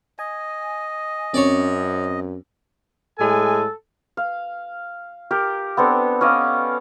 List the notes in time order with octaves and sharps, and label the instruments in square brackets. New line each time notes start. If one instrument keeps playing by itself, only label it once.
[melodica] D#5 [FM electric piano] G#5
[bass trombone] F#2 [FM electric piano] C4 C#4 [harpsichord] C#5 D5
[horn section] A2 G#3 G#5 [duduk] A4
[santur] F5
G4 A#4
B3 C4 D4 A4
C#4 D5 D#5 F5